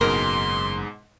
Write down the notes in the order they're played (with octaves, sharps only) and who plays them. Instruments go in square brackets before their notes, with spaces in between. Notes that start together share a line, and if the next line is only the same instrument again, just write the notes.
[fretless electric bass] F#1 [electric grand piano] G#2 B2 G#3 [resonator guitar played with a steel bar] A#4 [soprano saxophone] C6